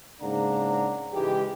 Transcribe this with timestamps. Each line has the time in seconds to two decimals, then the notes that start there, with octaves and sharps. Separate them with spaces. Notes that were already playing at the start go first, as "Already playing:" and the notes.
0.21 G#2 C#3 A#3 D4 F#5 A#5
1.13 G#2 C#3 E3 G#3 D#4 G4